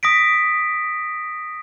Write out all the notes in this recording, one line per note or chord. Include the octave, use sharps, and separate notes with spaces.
D#6 A#6 B6 D7